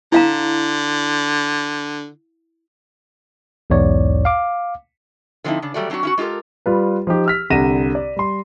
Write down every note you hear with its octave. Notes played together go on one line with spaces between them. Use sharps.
D3 E4 F5 A#5
B1 E2 G#2 C#5 D5
F5 D6
D3 F3 F#3 C4 D#4 E4
C#3 D4
F#3 G3 A3 F#4 D5
F#3 C4 D4 E4 F#4
C#4 E4 F#4
G#3 F4 G4 A4 A#4
G3 F4 B4
F3 D#4 G4
E6 F6 B6
C2 D3 F#5 A#6 D#7 E7
D5
G3 C6